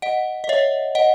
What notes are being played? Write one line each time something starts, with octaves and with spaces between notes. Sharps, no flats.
D#5 F#5
D#5
C#5 E5
D#5 F#5